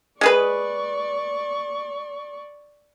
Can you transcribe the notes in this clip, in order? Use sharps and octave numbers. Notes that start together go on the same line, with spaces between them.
G#3 G#4 B4 D5 C#6